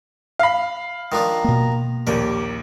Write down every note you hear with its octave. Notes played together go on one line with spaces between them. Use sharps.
F5 B5
D#3 F3 D4 A#5
B2 A#3
A#1 D#2 G4 A#4